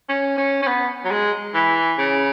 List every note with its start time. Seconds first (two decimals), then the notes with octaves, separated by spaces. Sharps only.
0.09 C#4
0.38 C#4
0.62 C#4
0.67 B3
1.05 F#3
1.11 G#3
1.54 E3
1.98 C#3